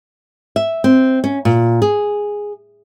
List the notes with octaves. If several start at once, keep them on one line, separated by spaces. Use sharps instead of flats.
E5
C4
C#4
A#2
G#4